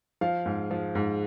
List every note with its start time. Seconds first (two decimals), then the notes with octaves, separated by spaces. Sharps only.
0.21 F3 F5
0.46 G#2
0.71 F3
0.95 G#2